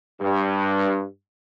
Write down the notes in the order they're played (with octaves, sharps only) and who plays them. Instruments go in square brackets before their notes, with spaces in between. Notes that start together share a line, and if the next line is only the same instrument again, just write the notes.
[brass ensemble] G2